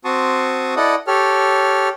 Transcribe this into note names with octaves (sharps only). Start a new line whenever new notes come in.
C4 F#4 A5 C6 C#6 D#6
E4 A4 D5 D#5 F#5 D#6
G4 A4 C#5 F6